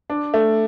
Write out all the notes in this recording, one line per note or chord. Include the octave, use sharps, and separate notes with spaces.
D4
A3